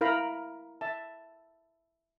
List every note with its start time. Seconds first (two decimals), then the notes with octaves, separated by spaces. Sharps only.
0.01 E4 A#4 F5 A#5 B5
0.81 E5 A5